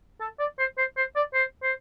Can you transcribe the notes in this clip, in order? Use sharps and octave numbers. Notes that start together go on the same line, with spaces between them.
A4
D5
C5
C5
C5
D5
C5
C5